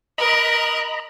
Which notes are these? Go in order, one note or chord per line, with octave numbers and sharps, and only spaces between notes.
A#4 D#5 A#5 B5 F#6